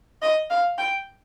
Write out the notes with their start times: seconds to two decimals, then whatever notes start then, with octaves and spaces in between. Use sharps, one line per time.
0.22 D#5
0.50 F5
0.78 G5